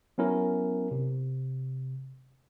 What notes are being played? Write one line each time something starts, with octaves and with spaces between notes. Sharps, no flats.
F#3 B3 C#4 E4 A#4
C3